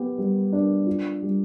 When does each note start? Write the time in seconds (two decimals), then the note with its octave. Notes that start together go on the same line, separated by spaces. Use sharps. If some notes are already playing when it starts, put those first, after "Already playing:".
Already playing: B3 G4
0.18 G3
0.53 D4
0.87 F4
1.22 G3